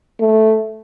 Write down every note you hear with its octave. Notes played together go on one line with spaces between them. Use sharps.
A3